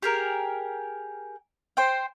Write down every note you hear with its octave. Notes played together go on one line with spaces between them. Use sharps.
G4 G#4 A#4
C5 G5